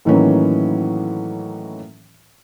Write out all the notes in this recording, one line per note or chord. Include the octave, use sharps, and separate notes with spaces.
A2 D#3 E3 F#3 A#3 C#4